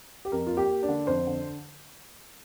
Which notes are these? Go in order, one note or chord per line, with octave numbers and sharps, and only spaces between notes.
G4
F2 A#4
A#3 F4
G4
A#3
D4
D3
F2 C5
D3